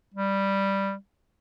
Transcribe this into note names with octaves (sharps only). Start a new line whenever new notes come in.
G3